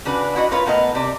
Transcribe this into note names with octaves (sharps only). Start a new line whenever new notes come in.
C#3 D4 F#4 B4
E4 F#4 D#5
F4 A#4 B4 C#5 F5
A2 B3 A#4 D#5
C3 D5